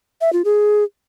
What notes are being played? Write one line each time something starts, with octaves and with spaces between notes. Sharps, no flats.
E5
F4
G#4